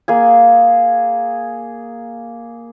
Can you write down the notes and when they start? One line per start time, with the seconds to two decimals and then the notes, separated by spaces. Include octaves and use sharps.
0.08 A#3 G#4 G#5